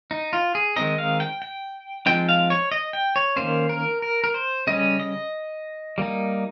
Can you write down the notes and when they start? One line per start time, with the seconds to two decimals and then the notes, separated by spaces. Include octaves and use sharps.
0.11 D#4
0.33 F4
0.55 G#4
0.76 D#3 G#3 C4 D#4 D#5
0.98 F5
1.20 G5
1.42 G5
2.06 F3 G#3 C4 D#4 G5
2.29 F5
2.50 C#5
2.71 D#5
2.93 G5
3.16 C#5
3.36 D#3 G3 A#3 C#4 C5
3.69 A#4
4.02 A#4
4.24 A#4
4.34 C5
4.67 C#3 G3 C#4 D#5
5.00 D#5
5.98 G3 A#3 D#4